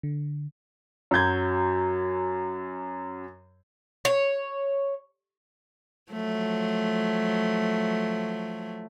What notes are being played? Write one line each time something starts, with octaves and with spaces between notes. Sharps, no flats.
D3
F#2 F#3 G6 G#6
C#5
F3 F#3 A3